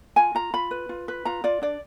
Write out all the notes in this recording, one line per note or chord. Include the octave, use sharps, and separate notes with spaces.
F4 G#5
F4 A#5
F4 B5
B4
F4
B4
F4 A#5
F4 D5
D4 D5